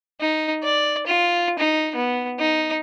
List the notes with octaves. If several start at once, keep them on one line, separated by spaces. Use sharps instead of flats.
D#4
D5
F4
D#4
B3
D#4